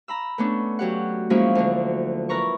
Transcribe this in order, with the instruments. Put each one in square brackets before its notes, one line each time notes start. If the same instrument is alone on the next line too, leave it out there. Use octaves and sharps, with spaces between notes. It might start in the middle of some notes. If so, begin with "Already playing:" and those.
[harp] A#5 B5 E6
A3 B3 C#4 D4
F#3 G4 F#5
F3 F#3 G#3 A#3 C#4 E4
D2 D3
E4 A#4 B4 A#5 C#6